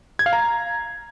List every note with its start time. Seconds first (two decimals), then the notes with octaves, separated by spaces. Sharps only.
0.19 G#6
0.26 F5
0.33 A#5